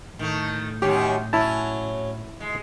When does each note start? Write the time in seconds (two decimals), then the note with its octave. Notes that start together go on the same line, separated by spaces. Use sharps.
0.19 A2 D#3 A3
0.82 F#2 D#3 C#4 G4
1.33 F#3 C#4 E4 A5
2.40 G#3